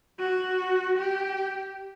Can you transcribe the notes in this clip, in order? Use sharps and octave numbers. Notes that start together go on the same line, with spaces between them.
F#4
G4